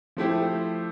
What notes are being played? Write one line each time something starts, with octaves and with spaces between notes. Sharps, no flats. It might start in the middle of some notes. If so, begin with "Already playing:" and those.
F3 A3 E4 G4 C5